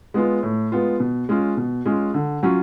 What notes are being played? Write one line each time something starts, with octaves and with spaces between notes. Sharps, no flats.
G#3 B3 F4
A2
G#3 B3 F4
B2
G#3 C#4 F4
B2
G#3 C#4 F4
D3
F#3 C#4 F4